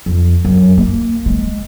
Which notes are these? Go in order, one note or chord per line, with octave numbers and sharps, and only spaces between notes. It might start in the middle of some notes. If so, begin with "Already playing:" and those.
F2
F#2
A#3
G#3